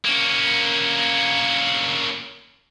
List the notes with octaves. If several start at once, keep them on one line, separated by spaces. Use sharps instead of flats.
A#3 C#4